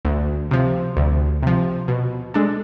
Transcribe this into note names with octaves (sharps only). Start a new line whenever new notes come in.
D2
C3 F3
D2
C3 F3
B2
G#3 D4 A4